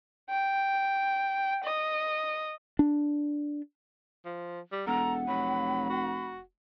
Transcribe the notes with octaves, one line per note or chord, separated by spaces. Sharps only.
G5
D#5
D4
F3
G3
E1 A4 F#5 A#5
F1 F#3 B5
F#4